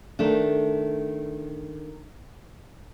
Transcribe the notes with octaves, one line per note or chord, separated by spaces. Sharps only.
D#3 A3 D4